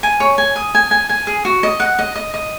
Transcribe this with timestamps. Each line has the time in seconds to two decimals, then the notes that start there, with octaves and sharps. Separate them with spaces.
0.03 G#5
0.20 C#5
0.38 G#5
0.56 D#6
0.75 G#5
0.91 G#5
1.09 G#5
1.27 G#4
1.45 F#4
1.63 D#5
1.80 F#5
1.99 D#5
2.16 D#5
2.34 D#5